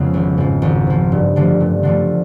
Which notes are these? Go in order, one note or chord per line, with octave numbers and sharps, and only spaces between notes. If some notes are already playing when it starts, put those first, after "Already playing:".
Already playing: F2 C#3 F3 G#3 B3
G#1
G#2 F3
G#1
G#2 F3
G2
D3 F3 A3
G2
D3 F3 A3